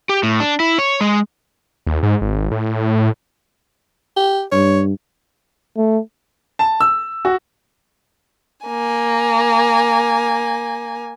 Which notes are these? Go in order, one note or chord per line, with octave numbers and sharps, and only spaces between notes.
G4
A2
D4
E4
C#5
G#3
D#2
G#2
G#1
A2
G4
G2 C#5
A3
A5
E6
F#4
A#3 G#5